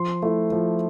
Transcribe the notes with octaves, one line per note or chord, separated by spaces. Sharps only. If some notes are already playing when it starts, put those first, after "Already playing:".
Already playing: F3 C6
A3 E4
F3